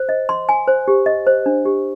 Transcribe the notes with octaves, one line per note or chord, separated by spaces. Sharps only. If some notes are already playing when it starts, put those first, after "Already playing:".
Already playing: C5
D#5
C6
G#5
C5
G4
D#5
C5
D4
G4